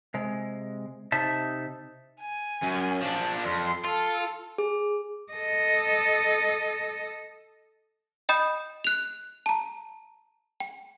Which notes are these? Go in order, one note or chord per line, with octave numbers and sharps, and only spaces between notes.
C3 G#3
C3 D#4 E5 A5
G#5
F#2
F3 D4
F2 C6
F4 A4
G#4
A4 D#5
D#5 G5 B5 D#6 G6
F#6 F7
A5 A#5
G5